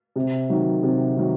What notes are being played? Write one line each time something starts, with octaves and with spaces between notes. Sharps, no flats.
C3
D#3 F#3
C3
D#3 F#3